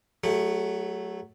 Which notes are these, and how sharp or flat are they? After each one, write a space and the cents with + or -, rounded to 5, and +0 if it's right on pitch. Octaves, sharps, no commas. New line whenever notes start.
F#3 +10 A3 +0 G#4 -45